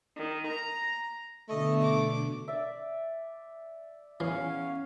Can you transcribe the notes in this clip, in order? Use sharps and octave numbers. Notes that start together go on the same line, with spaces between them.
D#3
A#5
B2 D3 A3 D#5
D6
D5 E5
E2 E3 C#4 F5